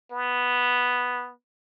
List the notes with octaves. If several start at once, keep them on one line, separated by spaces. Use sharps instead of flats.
B3